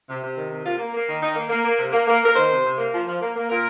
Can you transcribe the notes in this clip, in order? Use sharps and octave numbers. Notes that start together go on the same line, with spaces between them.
C3
C3
D#3
C3
A#3 F4
A#3
A#3
D#3
D#3 D#4
A#3
A#3
A#3
C3
A#3
A#3
A#3 A#4
D#3 C5
C3
C3
A#3
F3
F3
A#3
A#3
A#2 A#4